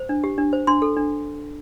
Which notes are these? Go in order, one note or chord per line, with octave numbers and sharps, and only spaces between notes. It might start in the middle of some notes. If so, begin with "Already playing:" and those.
Already playing: C5
D4
G4
D4
C5
D4 C6
A4
D4